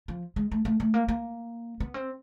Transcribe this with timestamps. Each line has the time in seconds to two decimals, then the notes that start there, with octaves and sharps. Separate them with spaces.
0.08 F3
0.36 G#3
0.52 A3
0.65 A3
0.80 A3
0.94 A#3
1.08 A#3
1.80 B3
1.94 C4